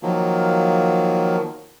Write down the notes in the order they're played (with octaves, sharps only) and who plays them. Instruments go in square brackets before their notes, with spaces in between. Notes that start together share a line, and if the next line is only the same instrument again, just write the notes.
[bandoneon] D#3 F3 F#3 A#3